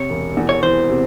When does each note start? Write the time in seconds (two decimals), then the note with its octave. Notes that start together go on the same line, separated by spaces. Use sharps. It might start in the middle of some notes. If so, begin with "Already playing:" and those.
Already playing: C3 C#5
0.10 E1
0.37 E2
0.49 C#5
0.63 E3 C5
0.90 C3